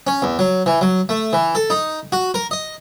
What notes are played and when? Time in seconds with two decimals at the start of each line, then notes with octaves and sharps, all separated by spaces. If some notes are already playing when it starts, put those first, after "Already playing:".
0.07 C#4
0.22 E2
0.39 F#3
0.66 E3
0.81 F#3
1.09 A3
1.33 E3
1.55 A4
1.70 D#4
2.12 F#4
2.34 A#4
2.51 D#5